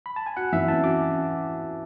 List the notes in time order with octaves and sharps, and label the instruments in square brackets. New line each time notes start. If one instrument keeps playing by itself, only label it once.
[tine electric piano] B5
A5
G#5
[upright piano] F#4 [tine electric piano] F#5
[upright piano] E3 [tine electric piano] E5
[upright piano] C#4 [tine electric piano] A5
[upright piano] F#4 [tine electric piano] D6